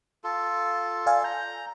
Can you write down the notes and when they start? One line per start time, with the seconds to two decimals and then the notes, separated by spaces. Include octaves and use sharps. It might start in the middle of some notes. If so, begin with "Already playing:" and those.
0.24 F4 A4
1.06 D5 F5 G#5
1.24 A#5 G6